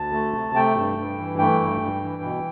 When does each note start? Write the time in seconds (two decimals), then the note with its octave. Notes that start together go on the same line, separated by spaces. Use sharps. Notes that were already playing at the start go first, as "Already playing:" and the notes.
Already playing: D2 A5
0.13 A3
0.34 C3
0.55 A3 G5
0.77 G2
0.97 G2
1.18 E3
1.39 A3 G5
1.60 G2
1.81 G2
2.02 E3
2.23 B2